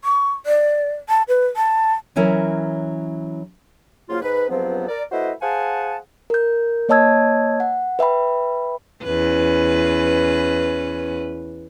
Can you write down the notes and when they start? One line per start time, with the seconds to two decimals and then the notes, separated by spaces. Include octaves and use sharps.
0.04 C#6
0.46 D5
1.09 A5
1.28 B4
1.56 A5
2.16 E3 F#3 C#4 E4 A#4
4.09 C#3 F3 F#3 A#3 F4
4.22 G#2 B4
4.50 C#2 G2 F3 F#3 B3 C4
4.88 A#4 D5
5.11 A3 E4 F#4 B4 C5 D#5
5.41 G#4 C5 F5 F#5 G#5 A5
6.30 A#4 G6
6.89 A#3 C#5 D#5 A5 E6 G#6
7.60 F#5
7.99 B4 E5 G5 B5
9.04 E2 C#4 B4